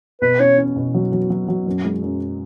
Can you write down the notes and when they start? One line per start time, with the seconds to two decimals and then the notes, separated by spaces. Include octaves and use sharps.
0.22 B2 B4
0.40 C#4 C#5
0.58 C#4
0.76 B2
0.94 F#3
1.12 F#3
1.30 F#3
1.48 F#3
1.66 F#2
1.85 G#3
2.02 F#2